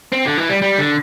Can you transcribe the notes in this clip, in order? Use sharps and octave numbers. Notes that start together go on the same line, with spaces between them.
C4
D3
E3
G3
G3
D3